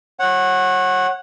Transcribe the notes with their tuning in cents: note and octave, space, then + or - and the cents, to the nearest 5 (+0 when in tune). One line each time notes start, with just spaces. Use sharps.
C#5 -30 F#5 +0